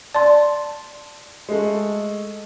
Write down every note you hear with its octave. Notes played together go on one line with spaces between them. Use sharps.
D5 A5 C6
G#3 A3